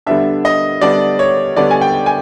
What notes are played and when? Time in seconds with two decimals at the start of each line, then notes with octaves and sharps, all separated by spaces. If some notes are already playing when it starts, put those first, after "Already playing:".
0.06 D3 G3 B3 D4 E5
0.45 D#5
0.81 D3 G3 B3 D4 D5
1.19 C#5
1.56 D3 G3 B3 D4 D5
1.71 G#5
1.81 G5
2.06 G#5